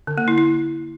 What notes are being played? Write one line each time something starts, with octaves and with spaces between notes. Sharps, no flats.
D3
A#3
E4
E4